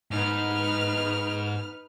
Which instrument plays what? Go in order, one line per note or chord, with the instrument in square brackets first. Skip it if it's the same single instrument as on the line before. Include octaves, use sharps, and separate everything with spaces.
[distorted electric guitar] G#2 [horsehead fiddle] D#4 B4 [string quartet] F6